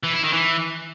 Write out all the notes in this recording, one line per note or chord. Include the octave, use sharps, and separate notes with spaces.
E3
E4
D#3
E3